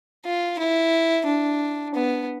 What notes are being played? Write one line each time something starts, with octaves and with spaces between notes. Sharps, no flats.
F4
E4
D4
B3